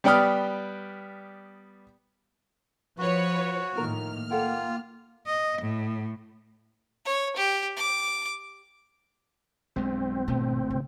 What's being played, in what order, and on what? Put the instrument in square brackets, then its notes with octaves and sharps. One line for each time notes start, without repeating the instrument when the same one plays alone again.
[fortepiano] G3 B3 D5 G5 D#6 F6
[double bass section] F3 [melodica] F#4 [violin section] B4 C#5
[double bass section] A2 D#3 A#3 [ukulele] F4 A#4 [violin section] F6
[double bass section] A#3 [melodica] F4 [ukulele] A4 F#5 G5
[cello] D#5
A2
[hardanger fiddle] C#5
G4
D6
[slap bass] B1 G2 G#3 [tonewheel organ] C4
[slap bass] G#1 G2 A3 [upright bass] B2
[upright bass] C#3